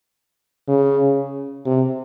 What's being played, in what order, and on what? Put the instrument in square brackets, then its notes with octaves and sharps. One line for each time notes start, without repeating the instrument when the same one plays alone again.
[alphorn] C#3
C3